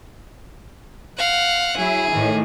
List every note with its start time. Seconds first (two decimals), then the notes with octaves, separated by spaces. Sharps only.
1.18 F5 F#5
1.76 F#3 E4 G#4
2.12 A2 D#3 E3